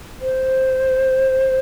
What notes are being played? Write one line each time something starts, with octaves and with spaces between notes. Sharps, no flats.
C5